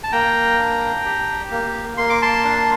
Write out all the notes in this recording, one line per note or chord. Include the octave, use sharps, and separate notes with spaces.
A5
A#3 G5 A#5
D4
G4
A#3
A#3 C6
D6
A5 C6
D4